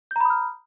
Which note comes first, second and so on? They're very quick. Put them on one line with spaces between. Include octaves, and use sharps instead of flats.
G6 A#5 B5 D#6 F6